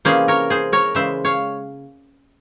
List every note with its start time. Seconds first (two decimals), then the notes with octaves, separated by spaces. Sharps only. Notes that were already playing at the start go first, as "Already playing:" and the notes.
0.05 C3 E3 A#3 C#4 G#4 C5
0.28 A#4 C#5
0.50 G#4 C5
0.72 A#4 C#5
0.95 C#3 E3 G#3 C5 E5
1.25 C#5 F5